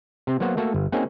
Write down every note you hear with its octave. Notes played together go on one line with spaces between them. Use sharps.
C3 C4
F#3 A#3 B3 F#4 C5
A3 A#3 F#4 A4
G1
A#3 C4 C#4 D#4 F#4 G#4